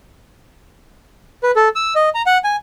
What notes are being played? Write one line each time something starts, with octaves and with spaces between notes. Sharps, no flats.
B4
A4
E6
D#5
A#5
F#5
G#5